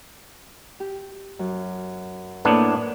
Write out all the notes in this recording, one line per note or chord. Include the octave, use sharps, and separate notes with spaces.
G4
F#2
A2 A#3 B3 D4 D5